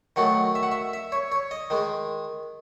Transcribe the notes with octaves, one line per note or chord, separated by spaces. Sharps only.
D#3 F#3 A3 F#5
E5
F#5
E5
E5
C#5
C#5
D#5
D#3 G#3